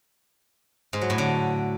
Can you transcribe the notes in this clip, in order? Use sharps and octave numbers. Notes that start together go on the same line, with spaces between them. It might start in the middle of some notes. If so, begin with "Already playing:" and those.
G#2
F#3
A2
D3